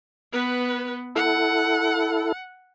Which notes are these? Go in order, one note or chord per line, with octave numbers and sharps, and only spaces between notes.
B3 B4
E4 A4 F#5